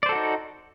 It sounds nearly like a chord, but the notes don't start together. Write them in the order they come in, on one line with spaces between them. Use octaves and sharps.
D5 C5 A4 F#4 D#4